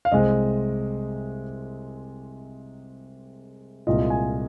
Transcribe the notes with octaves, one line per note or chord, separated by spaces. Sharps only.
F5
C2 C3 G#3 C4 D#5
C2 A#2 G#3 F4 D#5
G#5